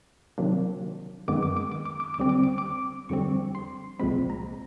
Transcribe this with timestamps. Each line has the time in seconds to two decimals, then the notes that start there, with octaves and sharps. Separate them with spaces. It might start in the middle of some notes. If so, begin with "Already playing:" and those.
0.38 C3 D#3 F#3 A#3 D4
1.28 F#2 D#3 G#3 B3 D6
1.43 D6
1.57 D6
1.72 D6
1.85 D6
2.00 D6
2.14 D6
2.18 D#2 D3 G3 C4
2.29 D6
2.43 D6
2.58 D6
3.09 F2 D3 G3 C4 C#6
3.55 C6
3.99 C2 A#2 F3 G#3 C4 B5
4.30 A#5